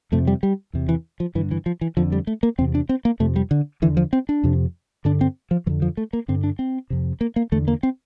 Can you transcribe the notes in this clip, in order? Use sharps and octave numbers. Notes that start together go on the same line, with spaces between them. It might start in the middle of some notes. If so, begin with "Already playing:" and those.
F2 C3 A3
G3
G3
E2 C3
E3
F3
G2 D3 E3
E3
F3
E3
F2 D3 F3
G3
A3
A#3
E2 C3 C4
D4
C4
A#3
F2 C3 A3
G3
D3
E2 D3 E3
F3
C4
D4
F2 C3
G2 D3 D4
C4
F3
F2 D3 E3
F3
A3
A#3
G2 D3 C4
D4
C4
F2 C3
A#3
A#3
E2 D3 A3
A#3
C4